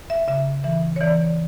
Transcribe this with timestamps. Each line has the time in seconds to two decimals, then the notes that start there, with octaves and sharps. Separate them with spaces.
0.10 E5
0.28 C#3 E5
0.64 E3 E5
0.96 C#5
1.01 E3 D5